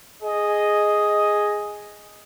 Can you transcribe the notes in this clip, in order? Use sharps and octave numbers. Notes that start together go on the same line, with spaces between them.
G#4 D#5